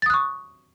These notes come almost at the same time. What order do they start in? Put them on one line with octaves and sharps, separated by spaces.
A6 D#6 F#6 C#6